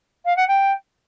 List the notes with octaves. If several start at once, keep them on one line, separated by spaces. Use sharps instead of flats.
F5
F#5
G5